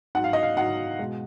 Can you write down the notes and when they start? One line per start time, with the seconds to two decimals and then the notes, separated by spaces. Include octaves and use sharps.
0.15 G#2 F#3 F#5
0.24 F5
0.33 D#5
0.43 F5
0.57 G#2 F#3 F#5
0.99 B2 G#3